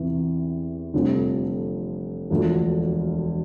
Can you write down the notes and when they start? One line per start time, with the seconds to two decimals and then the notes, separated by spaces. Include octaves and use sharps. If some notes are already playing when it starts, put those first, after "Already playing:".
Already playing: E2 C3 E3
0.93 F1 F2 D3 G3
2.30 E1 D2 D3 F3